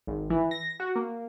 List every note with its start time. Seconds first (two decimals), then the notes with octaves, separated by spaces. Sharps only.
0.07 G#1
0.30 E3
0.51 A#6
0.80 F#4
0.96 A#3